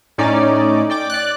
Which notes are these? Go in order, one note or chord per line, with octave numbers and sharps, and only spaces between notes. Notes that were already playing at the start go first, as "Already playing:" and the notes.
A2 C#4 D#4 D5
D5 G5 D6
D5 F#6